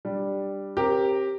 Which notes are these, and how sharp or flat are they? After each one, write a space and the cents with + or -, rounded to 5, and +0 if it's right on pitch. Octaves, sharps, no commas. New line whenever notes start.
G3 +0 D4 +0
C4 +35 G4 +0 A#4 +0